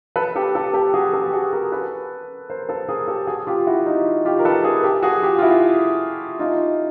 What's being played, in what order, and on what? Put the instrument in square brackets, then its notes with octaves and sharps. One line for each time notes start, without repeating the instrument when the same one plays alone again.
[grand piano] A4 B4
G4 A4
G4 A4
G4 A4
F#4 G#4
G4 A4
G4
F#4 G#4
G#4 A#4
A4 B4
A#4 C5
A4 B4
G#4 A#4
G4 A4
F#4 G#4
F4 G4
E4 F#4
D#4 F4
F4 G4
A#4
A4 B4
G#4 A#4
G4 A4
F#4 G#4
F4 G4
F4
E4 F#4
D#4 F4